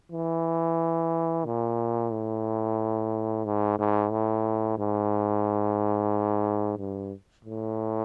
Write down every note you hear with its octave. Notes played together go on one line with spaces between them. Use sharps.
E3
A#2
A2
G#2
G#2
A2
G#2
G2
A2